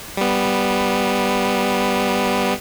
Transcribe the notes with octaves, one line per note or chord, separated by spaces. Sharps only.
G3 B3